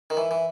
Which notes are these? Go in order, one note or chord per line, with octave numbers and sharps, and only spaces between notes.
D#3
E3
E3